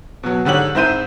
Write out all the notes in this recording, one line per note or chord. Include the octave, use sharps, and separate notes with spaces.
B2 F#3
G#2 D3 G4 C#5 F#7
G#2 C4 E4 C5 G6 D#7